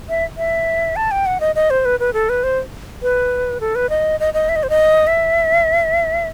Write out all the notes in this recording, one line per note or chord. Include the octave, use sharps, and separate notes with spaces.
E5
E5
A5
G5
F#5
D#5
D#5
C5
B4
B4
A4
B4
C5
B4
A4
B4
D#5
D#5
D#5
E5
D#5
C5
D#5
E5